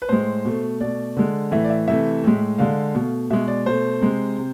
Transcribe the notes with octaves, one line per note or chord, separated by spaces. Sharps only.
B4
A2 G#3 C5
B2 A3
B2 A3 D5
D3 G#3
A2 E3 A3 E5
D5
E5
C3 E3 A3 E5
A2 G#3
D3 G#3 F5
B2 A3
B2 G#3 E5
D5
B2 A3 C5
C3 G#3
C3